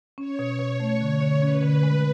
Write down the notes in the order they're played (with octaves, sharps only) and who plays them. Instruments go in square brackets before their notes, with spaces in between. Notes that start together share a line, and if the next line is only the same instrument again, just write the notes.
[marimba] C#4 [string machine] C#5
[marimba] B2
B2
A3
D3
D3
[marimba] C#4 [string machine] B4
[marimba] D3
G#3